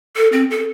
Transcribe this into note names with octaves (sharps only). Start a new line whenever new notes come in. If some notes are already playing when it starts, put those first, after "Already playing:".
A4
C4
A4